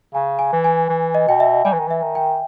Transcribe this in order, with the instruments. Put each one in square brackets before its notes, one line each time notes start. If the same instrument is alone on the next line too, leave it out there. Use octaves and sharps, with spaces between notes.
[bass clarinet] C#3 [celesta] G#5
[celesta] G#5
[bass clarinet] E3
[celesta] G#5
[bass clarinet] E3
[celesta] D#5
[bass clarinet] B2 [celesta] G5
[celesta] E5
[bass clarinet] G3 [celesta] G#5
[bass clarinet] E3
D#3
[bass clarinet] E3 [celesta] E5
[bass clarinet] D#3
[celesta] G5